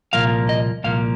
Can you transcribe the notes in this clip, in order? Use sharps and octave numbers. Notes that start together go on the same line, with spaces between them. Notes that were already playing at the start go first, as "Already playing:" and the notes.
C2 A#2 F3 A#3 F5
D#5
C2 A#2 F3 A#3 F5